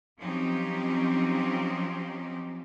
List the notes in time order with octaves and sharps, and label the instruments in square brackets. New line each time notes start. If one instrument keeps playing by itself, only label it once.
[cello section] F3 F#3 C4 C#4 D#4 G4